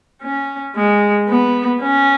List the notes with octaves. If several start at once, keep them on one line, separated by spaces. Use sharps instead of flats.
C#4
G#3
B3
C#4